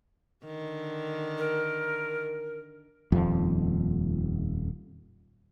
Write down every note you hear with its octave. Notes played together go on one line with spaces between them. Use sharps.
D3 D#3
A#4
D#1 F2 F3